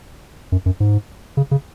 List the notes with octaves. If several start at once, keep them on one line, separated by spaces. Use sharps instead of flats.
F#2
F#2
G#2
C#3
C#3